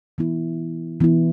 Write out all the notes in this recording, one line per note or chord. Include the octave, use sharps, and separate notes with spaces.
E3 B3 E4
E3 B3 E4